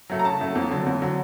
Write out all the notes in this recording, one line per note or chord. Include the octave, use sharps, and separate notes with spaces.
F#3 A3
A#5
C#3 A5
F#3 A3
F2
D3 F#3
F2
D3 F#3